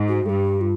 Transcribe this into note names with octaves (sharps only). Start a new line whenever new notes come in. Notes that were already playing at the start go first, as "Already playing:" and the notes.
Already playing: G#2
F#4
G2 G4 A4
F4